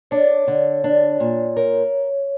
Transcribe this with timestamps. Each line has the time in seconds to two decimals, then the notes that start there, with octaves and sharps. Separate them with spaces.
0.11 D4 C#5
0.48 D3
0.84 D4
1.20 A#2
1.57 A#4 C#5